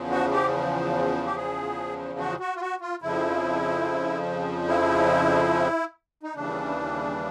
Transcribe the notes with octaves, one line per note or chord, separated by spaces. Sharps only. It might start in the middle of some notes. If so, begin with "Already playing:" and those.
Already playing: E2 C#3 F3
F#4
G4
G4
G#4
F#4
F#4
F4
F#4
F4
F2 C#3 F3 E4
E4
D#4
D#2 C#3 E3 G3 D4